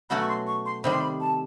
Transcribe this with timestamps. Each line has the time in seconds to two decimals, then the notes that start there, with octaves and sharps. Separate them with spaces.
0.10 B2 F#3 A3 C#4 F#4 B5
0.20 C#6
0.29 C6
0.47 C#6
0.65 C6
0.84 C3 D#3 G3 B5
0.92 C6
1.00 B5
1.21 A5